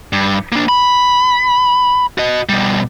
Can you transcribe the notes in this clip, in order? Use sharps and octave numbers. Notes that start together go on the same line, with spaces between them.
G2
A#3 D4
B5
F#4 D#5
B2 G3